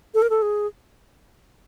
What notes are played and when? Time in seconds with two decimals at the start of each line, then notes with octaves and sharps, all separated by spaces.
0.14 A4
0.22 A#4
0.30 A4
0.42 G#4